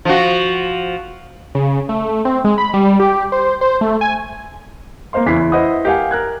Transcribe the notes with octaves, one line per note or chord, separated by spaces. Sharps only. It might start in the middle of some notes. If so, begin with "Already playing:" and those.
F3 F#4
C#3
A3
C4
G#3
B5
G3
G4
C5
C5
A3
G#5
A#3 A#4 C5 F5 C6
E2 C#3 E3 E4 B6 C7
E4 B4 C5 D#5 F#5 D#6
G4 A#4 F5 F#5 G#5
A#4 F#6 G#6